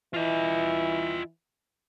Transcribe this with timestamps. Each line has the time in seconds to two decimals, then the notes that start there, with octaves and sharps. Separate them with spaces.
0.14 E3 F4 D#5